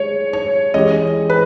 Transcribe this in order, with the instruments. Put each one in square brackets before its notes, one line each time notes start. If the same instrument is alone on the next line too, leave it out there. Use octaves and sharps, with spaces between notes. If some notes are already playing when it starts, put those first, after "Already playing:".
Already playing: [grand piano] G#3 [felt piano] C#5
[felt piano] C#5
[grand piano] E3 G#3 C#4 G4 [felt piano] D#5
[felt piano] B4